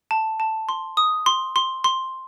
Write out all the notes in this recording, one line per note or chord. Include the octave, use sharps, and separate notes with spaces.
A5
A5
C6
D#6
C6
C6
C6